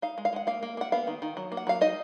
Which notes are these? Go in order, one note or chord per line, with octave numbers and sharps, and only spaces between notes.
D#4 F5
G#3
F5
G#3 F#5
A#3 F5
A#3
A#3 F#5
B3 F5
D#3
D#3
F#3
A#3
F#5
F#3 F5
D#4 D#5